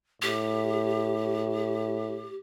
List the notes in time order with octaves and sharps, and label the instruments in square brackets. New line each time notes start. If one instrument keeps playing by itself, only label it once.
[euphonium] A2 [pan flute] G4